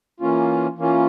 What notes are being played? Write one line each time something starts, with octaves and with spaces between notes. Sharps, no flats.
E3 A#3 C#4 F4
E3 A#3 C#4 F4